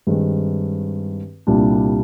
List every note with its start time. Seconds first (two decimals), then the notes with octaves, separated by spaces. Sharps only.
0.07 G2 D#3 G#3 C4
1.47 C2 A#2 G3 D4